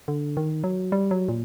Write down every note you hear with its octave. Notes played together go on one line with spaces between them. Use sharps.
D3
D#3
F#3
G3
F#3
A#2